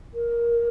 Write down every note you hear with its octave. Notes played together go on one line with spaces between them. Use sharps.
A#4